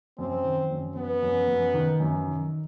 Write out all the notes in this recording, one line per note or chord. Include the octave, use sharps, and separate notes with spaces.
F#2 C4
D#3
F#2
F#2 B3
F#2
F#2
D#3
F#2
D#3